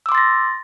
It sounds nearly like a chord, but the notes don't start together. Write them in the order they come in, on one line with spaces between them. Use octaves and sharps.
E6 D6 C6 A6 A#6